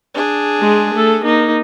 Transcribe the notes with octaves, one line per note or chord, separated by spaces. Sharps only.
D4 G#4
G#3
A3 A4
A#3 D#4